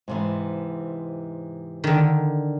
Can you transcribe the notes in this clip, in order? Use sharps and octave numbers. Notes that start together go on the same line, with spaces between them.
G#2 C3 E3
D3 D#3